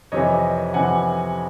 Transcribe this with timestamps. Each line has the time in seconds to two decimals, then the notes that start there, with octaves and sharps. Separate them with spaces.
0.12 F2 C3 E3 C#5 D#5
0.74 F2 C3 E3 F#5 G#5